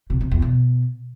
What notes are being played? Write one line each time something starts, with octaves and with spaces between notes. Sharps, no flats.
C3
C3
E2
B2